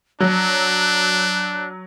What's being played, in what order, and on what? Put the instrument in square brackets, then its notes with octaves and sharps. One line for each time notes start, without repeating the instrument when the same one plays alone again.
[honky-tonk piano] F#3 [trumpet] D4 [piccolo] F#6